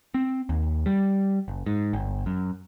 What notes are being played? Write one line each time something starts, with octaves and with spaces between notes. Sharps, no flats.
C4
D#2
G3
F#1
G#2
G1
F#2